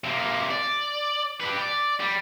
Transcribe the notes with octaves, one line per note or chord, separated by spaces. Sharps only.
C3 A#3
D5
G4 B4
D5
G3